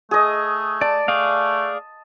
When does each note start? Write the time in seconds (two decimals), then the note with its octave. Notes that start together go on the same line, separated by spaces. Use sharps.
0.11 A3 G#4 D#5
0.81 D5 A5
1.08 A3 G#4 D5 F5